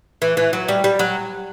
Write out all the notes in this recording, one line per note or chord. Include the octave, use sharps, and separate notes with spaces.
E3
E3
F#3
G3
G3
F#3